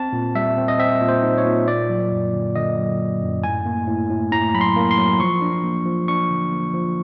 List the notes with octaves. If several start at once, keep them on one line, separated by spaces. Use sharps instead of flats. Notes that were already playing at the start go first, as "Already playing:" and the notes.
Already playing: C4 A5
A#2
G3 E5
C4
D#5
C4 E5
A#2
C5
D#4
C#5
A#2
A#3 D5
F#3
F#2
D3
D3 D#5
F#3
F#3
F#2
A2 G#5
A#3
A2
A2
A2 A#5
F#3 B5
C6
A#3
C6
F#3
F3 C#6
D4
A#3
F3
D4 C#6
D3
A#3
F3